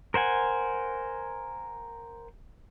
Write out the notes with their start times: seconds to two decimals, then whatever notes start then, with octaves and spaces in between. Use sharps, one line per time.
0.14 A#4 C5 F#5 G#5